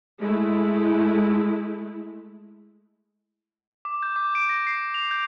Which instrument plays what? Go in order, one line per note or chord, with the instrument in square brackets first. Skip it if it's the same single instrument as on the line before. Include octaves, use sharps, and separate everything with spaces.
[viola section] G#3 A3 E4
[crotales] D6
G6
D6
D7
A#6
C7
F7
G6